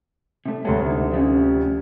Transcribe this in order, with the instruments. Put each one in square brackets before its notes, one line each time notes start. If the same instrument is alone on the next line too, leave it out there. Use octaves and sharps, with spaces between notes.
[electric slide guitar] C3 A3
[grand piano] D2 C3 [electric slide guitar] F#3 G#3 A4
[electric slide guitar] D3 D#4
F3 G3 C#4